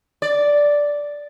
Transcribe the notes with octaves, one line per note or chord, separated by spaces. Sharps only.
D5